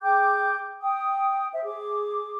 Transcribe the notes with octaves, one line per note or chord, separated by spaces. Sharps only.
G#4 G5 D6 G6
G5 D#6
C5 E5
G#4 D6